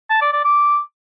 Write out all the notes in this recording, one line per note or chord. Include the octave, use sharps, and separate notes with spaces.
A5
D5
D5
D6